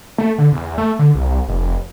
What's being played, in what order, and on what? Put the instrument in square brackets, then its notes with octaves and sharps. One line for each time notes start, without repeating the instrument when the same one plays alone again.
[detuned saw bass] A3
D3
E2
A3
D3
C2
F1